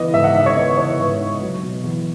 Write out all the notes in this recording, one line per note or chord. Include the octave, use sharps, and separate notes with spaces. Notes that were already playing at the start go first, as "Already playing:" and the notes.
Already playing: E3 B3 D#5
G#2 E5
F#5
D#4 E5
C#5
B3 D#5
E3 C#5
G#2 B4
D#4
F#3
B2
E2